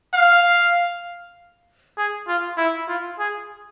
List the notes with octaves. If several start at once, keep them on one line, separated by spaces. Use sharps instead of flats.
F5
G#4
F4
E4
F4
G#4